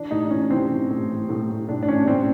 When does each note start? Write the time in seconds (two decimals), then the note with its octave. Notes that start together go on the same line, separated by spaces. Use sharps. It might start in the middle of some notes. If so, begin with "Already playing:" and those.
Already playing: E3 D4
0.11 A2 D#4
0.30 E3 C#4
0.50 E3 C4
0.71 E3
0.90 A2
1.10 E3
1.29 A2
1.49 A2
1.69 A2 D4
1.83 D4
1.88 E3 C#4
2.08 A2 C4